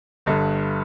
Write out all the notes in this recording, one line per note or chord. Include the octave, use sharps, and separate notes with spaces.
G1 G2 D3